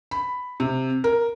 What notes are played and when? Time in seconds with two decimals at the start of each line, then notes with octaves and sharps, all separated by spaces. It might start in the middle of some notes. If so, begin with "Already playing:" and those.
0.11 B5
0.60 C3
1.04 A#4